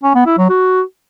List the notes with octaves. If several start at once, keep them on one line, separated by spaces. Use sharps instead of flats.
C#4
B3
E4
F#3
F#4